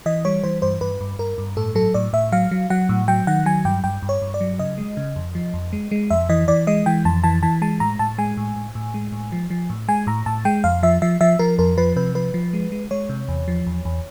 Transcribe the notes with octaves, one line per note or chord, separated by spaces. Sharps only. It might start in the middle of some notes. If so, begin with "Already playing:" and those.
E3 D#5
G3 C#5
E3 C5
G2 C5
G2 B4
G2
G2 A#4
G2
A2 A4
F#3 A4
A2 D5
A2 E5
F#3 F5
F#3
F#3 F#5
A2
F#3 G5
D#3 F#5
F#3 G#5
G2 G5
G2 G5
G2
C#5
G2
D5
F#3
C#3 D#5
G#3
C#3
F2
F3
F2
G#3
G#3
F2 E5
E3 D#5
E3 D5
G#3 D#5
E3 G5
F2 A5
E3 A5
E3 A5
G#3 A5
A2 A#5
A2 A5
G#3 G#5
A2
A2
A2
G#3
A2
F3
F3
A2
G#3 G#5
A2 A#5
A2 A5
G#3 G5
F2 F5
F3 E5
F3 E5
F3 E5
F3 A#4
F2 A#4
F3 B4
C3 B4
F3 B4
F3
G#3
G#3
G#3 C#5
C3
E2
F3
E2
E2